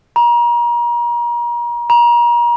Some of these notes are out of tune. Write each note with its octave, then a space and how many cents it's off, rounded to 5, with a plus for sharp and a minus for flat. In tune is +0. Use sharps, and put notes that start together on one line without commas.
A#5 +35
A#5 +35